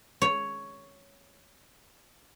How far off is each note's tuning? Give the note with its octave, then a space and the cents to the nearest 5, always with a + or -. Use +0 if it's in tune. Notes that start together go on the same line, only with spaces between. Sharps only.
C#5 +5